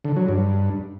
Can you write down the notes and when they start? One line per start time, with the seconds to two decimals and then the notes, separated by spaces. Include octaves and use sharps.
0.05 D3
0.17 F#3
0.28 G2